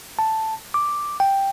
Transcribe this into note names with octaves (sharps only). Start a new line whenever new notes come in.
A5
D6
G5